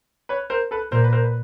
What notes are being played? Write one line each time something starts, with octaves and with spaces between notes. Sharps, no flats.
B4 C#5
A#4 C5
A4 B4
A#2 A#4 C5
B4
A#4 C5
B4